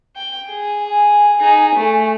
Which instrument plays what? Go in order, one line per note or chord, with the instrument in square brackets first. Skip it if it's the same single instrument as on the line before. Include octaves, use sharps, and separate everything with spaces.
[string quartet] G5
G#4
[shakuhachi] G#5
[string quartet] D#4 G#4
A3